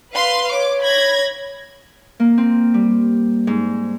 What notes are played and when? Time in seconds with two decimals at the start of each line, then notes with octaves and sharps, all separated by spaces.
0.13 B4 F5 C6
0.51 C#5 D6
0.82 B5 G#6 A#6
2.20 A#3
2.38 C4
2.74 G3
3.47 G#2